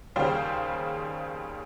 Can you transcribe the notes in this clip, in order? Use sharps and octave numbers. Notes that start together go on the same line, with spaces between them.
D#2 C#3 G3 C5 F5 G5